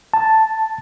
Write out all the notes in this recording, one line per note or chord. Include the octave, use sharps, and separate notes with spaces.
A5